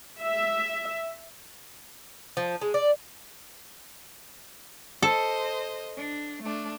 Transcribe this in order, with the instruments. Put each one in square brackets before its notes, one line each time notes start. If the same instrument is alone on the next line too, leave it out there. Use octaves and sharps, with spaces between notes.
[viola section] E5
[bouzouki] F3
G#3
D5
[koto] A4 [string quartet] C5 D#5
[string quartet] D4
A3 D4